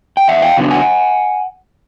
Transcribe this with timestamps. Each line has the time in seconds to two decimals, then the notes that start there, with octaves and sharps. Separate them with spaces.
0.17 G5
0.28 E2 E5 F#5
0.42 F5 G5
0.57 C#3 F#3 B3 D4
0.71 F#5 G#5